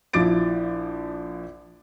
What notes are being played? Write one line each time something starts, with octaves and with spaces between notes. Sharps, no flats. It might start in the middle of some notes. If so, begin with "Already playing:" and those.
A#1 F3 E4 D6 A6 D7